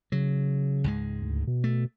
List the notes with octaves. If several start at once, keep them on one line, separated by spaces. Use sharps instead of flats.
C#3 F#3
C#2 G#2 G#3
D2
B2
A3